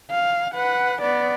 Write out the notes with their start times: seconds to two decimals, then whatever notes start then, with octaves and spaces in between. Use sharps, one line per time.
0.11 F5
0.54 B4 F#5
1.02 B3 D5